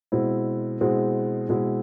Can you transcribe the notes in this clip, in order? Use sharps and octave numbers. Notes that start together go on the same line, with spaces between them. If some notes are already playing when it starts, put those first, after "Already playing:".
B2 G#3 C4 E4
B2 G#3 C4 E4
B2 G#3 C4 E4